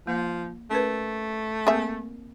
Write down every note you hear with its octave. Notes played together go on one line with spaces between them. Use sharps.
F3 A#3
A3 C#4 A#4 B4
A#3 C4 G#4 A#4 E5